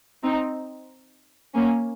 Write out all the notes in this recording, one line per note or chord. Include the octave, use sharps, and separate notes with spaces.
C4 D#4
A#3 C#4